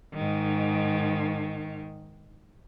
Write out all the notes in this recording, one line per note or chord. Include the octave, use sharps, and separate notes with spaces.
G#2 D#3